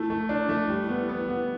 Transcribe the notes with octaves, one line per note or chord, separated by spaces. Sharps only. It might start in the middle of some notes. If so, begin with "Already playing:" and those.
Already playing: A3 E4
A3
D4
A3
G3
B3
B3
B3